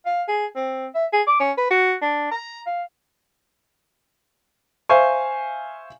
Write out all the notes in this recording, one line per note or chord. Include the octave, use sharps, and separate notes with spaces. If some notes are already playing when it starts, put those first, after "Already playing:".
F5
G#4
C4
E5
G#4
D6
C#4
B4
F#4
D4
A#5
F5
C5 E5 F5 G#5 C#6